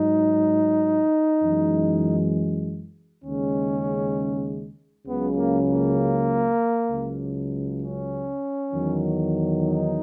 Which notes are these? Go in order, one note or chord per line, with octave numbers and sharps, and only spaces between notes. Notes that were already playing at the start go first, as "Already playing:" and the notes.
Already playing: G#2 F#3 D#4
F#2 E3 G#3
D#2 C#3 G#3 C#4
C#2 C#3 F#3 B3
A#3
A#3
C#2 C#3 F#3
C#4
E2 D#3 F#3
D#4